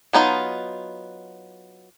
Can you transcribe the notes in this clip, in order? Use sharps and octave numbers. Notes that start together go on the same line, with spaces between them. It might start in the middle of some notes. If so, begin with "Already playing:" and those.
F#3 B3 D#4 F4